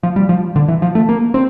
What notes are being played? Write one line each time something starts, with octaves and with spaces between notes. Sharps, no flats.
F3
G3
F3
D3
E3
F3
A3
A#3
C4